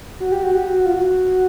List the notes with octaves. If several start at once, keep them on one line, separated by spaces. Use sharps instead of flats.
F#4
G4
F#4
G4
F#4
F4
F#4